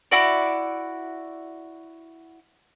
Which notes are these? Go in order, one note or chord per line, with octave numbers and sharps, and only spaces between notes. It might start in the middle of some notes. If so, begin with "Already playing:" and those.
E4 F#4 D5